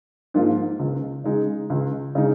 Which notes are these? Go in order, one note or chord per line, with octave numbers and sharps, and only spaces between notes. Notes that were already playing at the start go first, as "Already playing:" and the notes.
G#2 F3 A#3 F4
C#2
C#3 G#3 D#4
C#2
C#3 G#3 D#4